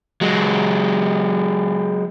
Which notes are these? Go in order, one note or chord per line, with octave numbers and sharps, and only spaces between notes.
F#3 G#3